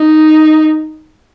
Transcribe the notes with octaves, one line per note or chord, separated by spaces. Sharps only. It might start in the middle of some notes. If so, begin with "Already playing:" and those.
Already playing: D#4